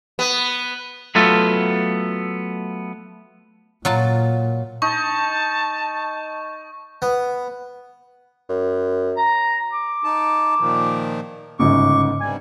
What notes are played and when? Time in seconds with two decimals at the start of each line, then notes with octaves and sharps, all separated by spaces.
0.19 B3
1.15 F#3 A3 B3 F4 A4
3.85 A#2 F#3 F4 A5
4.82 D#4 A5 C#6
7.02 B3
8.49 F#2
9.17 A#5
9.73 D6
10.04 D#4 A5
10.60 A#2 D#3 F3
11.59 G1 G#2 C#3 C#6 D6
12.21 G2 C3 G3 G#5